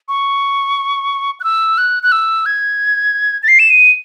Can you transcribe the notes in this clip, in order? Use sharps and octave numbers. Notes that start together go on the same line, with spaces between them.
C#6
F#6
E6
F#6
F#6
E6
G#6
A6
C7
E7
D#7